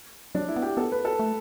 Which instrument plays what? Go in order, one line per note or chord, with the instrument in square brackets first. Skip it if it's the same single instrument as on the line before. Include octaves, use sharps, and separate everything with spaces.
[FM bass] F#3 [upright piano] D4
[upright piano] E4
[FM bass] B3
[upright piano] G4
[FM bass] B3 [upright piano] A4
[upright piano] B4
A4
[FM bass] A3